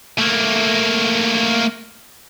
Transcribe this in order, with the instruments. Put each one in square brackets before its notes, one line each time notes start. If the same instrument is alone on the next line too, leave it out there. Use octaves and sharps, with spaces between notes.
[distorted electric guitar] A3 A#3